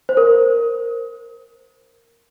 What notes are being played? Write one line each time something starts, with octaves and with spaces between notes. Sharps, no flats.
C5
A#4